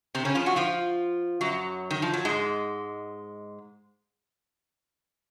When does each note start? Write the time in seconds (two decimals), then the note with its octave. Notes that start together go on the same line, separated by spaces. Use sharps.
0.15 C3 C4
0.25 C#3 C#4
0.35 F3 F4
0.46 F#3 F#4
0.56 F3 F4
1.41 F#2 F#3
1.91 D#3
2.02 F3
2.14 F#3
2.25 G#2 G#3